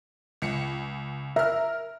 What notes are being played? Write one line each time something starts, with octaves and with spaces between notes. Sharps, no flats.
C#2 C#7
A#4 E5 F6